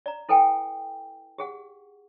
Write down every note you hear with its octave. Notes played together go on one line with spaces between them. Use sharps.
D5 A#5
E4 A4 B4 G5 G#5
G4 G#4 F#5